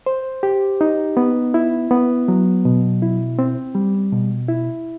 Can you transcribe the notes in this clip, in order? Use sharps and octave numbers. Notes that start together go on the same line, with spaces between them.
C5
G4
D#4
B3
E4
B3
F#3
B2
E4
C4
G3
B2
E4